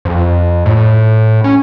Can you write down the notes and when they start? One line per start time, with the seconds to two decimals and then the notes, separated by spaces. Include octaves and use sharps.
0.05 F2
0.66 A2
1.44 C#4